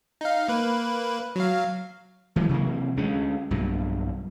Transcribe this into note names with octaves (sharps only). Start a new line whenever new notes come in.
D#4 F5
A#3 B4
F#3 F5
E3 F#3 G#3
C3 E3 F#3 A#3
D2 G#3 C#4
B1 G2 A#2